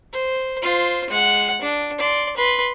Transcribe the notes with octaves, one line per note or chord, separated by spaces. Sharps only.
C5
F4 C5
G#3 F#5
D4
D5 C6
B4 C6